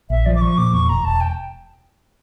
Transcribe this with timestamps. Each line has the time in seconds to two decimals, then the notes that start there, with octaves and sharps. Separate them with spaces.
0.10 A#1 E5
0.26 F3 D5
0.35 D6
0.41 F3 C#6
0.57 A#2 D6
0.73 E2 C#6
0.88 E1 A#5
1.05 E1 A5
1.21 G5